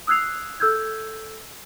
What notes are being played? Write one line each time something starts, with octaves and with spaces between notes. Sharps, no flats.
D#6 E6 F#6 G#6 C7 F7
A4 E6 F6 G6 G#6